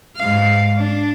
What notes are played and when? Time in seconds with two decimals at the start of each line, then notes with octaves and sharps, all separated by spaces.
0.17 G#2 F5
0.76 D4